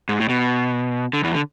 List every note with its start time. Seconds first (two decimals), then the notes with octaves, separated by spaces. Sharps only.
0.09 G#2
0.20 A2
0.29 B2
1.13 D3
1.24 E2 E3
1.35 D3